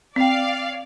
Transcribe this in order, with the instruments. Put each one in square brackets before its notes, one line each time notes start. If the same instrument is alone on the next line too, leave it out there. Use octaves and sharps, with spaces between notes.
[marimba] C4 G5 [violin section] D5 F5